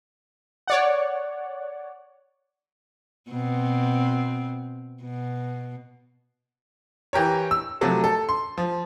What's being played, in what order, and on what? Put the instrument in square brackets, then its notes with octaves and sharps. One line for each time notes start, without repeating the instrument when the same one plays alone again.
[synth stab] C#5 D5 F#5
[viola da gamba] B2 C4
B2
[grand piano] E3 G4 A#4 C#5
E6
C3 F3 F#3 A3
A4
C6
F3